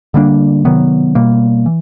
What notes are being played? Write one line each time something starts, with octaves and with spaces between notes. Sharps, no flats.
D3 G3 A#3 D4
C3 D#3 F#3 B3
B2 G3 A#3
E3